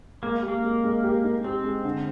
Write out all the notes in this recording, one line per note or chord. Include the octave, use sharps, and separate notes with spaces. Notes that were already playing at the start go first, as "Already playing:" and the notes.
G#3 A#3
G4
A#3
G#3
G#3
G4
D#4
C4 G4
G#3
D3